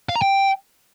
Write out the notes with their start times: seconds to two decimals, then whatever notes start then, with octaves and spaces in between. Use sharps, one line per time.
0.09 F5
0.15 A#5
0.22 G5